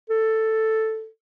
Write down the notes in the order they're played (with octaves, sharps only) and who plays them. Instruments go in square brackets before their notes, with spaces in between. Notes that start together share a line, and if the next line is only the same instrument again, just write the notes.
[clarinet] A4